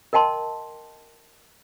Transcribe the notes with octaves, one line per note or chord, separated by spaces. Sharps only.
A#4 D#5 G5 A5 C6